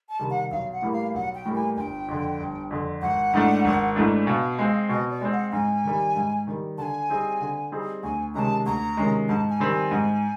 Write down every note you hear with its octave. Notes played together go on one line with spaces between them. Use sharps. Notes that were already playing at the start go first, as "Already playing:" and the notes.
A5
C3 D#3 G3
F#5
B1 F5
F#5
A2 E3 G3 A#3
F5
B1 F#5
G5
A2 E3 G3 A#3
G#5
G1 G5 G#5
F2 D3
G1
F2 D3
G#1 F#5
G#2 E3 A3 D4
G#1
G#2 E3 A3 D4
B2 F5
G#3 C4
B2 D#5
D5
G#3 C4
F#5
G#2 G#5
D#3 G3
G#2
D#3 G3
D3 G#5 A5
G3 C4 D#4 G#4
D3
G3 C4 D#4 G#4
D2 G#5
C3 D#3 G#3 C#4 A5 A#5
D2 A#5
C3 D#3 G#3 C#4
G#2 A5
G#5
D#3 G3 C4
G#5
G#2